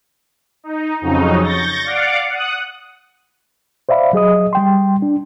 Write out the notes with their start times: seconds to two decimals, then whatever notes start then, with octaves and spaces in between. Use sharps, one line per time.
0.64 D#4
1.01 F2 C#3 F#3 D#4
1.42 C#6 G6 A6 A#6
1.84 D5 F5 F#5 D6
2.31 F#5 D#6 F#6
3.89 C5 D5 E5 F5 B5
4.13 F#3 G#4 D#5 D#6
4.53 G3 G5 C6
5.02 D4